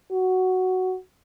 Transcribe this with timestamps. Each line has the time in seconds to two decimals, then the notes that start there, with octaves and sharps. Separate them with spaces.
0.11 F#4